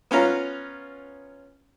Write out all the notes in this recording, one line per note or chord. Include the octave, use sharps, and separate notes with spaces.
B3 C#4 F4 A#5